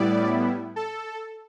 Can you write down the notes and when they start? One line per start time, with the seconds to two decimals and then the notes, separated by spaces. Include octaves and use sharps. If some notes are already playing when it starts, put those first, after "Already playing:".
Already playing: A2 G3 B3 E4 D5
0.76 A4